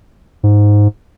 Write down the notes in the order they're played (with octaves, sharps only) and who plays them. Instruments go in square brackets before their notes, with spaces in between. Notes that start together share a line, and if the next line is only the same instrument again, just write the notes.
[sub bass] G#2